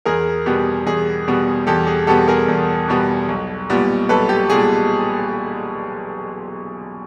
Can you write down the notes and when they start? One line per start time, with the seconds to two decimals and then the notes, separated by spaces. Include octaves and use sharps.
0.05 E2 G#4 A#4
0.46 B2 G3 B3 G4
0.86 E2 G#4
1.28 B2 G3 B3
1.67 E2 G4 A4
1.87 G#4
2.07 B2 G3 B3 G4 A4
2.28 G#4 A#4
2.48 E2
2.88 B2 G3 B3
3.29 B1
3.70 A#2 G3 B3
4.09 B1 A4 B4
4.29 G4
4.50 A#2 G3 B3 G#4